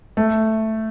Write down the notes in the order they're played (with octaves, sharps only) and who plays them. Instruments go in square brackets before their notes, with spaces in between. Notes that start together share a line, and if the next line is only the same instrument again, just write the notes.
[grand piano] A3